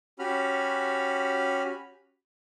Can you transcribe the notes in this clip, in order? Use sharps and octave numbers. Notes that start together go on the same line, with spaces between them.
C#4 F#4 G4 B5 F6